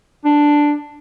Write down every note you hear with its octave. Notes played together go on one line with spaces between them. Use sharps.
D4